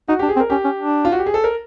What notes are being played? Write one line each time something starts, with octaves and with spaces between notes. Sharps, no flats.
D#4 F#4
D4 G4
G#4
C4
A#4
C#4 G4
C#4
D4
F4
F#4
G4
G#4
A4
A#4